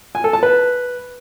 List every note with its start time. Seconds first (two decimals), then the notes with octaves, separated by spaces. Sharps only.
0.15 G#5
0.24 A4
0.33 A5
0.43 B4